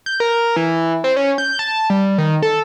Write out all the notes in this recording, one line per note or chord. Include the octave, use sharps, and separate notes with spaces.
G6
A#4
E3
C4
C#4
G6
A5
G3
D#3
A4